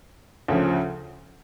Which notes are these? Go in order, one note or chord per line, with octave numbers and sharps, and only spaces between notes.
D2 C#3 F3